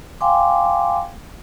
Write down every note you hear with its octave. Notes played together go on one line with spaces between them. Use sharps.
F5 G5 G#5 C6 D6